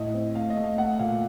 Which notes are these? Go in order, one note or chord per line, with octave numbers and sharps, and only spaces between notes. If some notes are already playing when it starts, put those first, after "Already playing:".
Already playing: A2 A3 D#5
C4
A3 F5
D#5
A3
F5
A3 F#5
A#2 F5